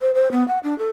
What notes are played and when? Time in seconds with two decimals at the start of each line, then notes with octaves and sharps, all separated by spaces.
0.01 C5
0.14 C5
0.32 B3
0.48 F#5
0.63 D4
0.79 A4